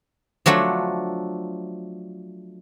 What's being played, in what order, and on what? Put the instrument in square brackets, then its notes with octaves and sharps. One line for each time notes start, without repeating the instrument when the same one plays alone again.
[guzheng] F3 F#3 A3 D4